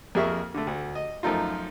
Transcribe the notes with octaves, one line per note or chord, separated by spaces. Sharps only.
F2 A#3 G#4 E5 C#6
D3 A3
D2
D#5
F#2 F3 A3 D#4 F4